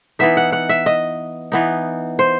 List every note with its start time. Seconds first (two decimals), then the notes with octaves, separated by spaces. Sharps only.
0.19 E3 B3 D#4 E5
0.37 F#5
0.52 F#5
0.69 E5
0.86 D#5
1.52 E3 B3 D#4
2.19 C5